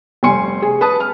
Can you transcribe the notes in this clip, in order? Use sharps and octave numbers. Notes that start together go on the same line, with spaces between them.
F1 G3 G#5 C6 C#7
G#4
B4 A5 D#6
F6